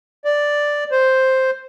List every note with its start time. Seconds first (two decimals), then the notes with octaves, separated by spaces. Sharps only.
0.25 D5
0.91 C5